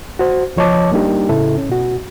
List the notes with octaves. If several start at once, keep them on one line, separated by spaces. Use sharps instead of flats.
F#4 C5
C#2 F3 C#5 D#5 A5 D6
G3 A#3 D4 D#4 G4
A2 C#3 E4 A4
C#4
B2 F#4